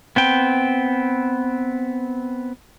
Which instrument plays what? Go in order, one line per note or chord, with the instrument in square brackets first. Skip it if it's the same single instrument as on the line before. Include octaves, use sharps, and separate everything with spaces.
[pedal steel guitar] B3 C4 G5